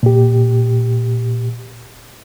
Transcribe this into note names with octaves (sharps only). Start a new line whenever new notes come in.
A#2 G4